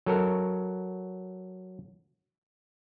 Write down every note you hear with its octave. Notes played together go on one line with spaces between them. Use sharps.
F#3 A4 A#4